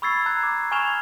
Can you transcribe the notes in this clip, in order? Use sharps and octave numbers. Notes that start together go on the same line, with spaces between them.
B5 C#6 E6 G#6 A6 C7
A#5 F#6 G#6
D6
G#5 C#6 F6 G#6 E7 F7